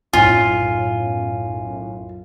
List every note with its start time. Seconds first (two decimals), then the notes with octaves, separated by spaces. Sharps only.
0.13 B1 F#2 A2 F4 G#5